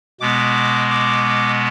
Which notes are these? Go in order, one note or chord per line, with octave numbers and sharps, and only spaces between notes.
B2 G#3 B3 D6
D6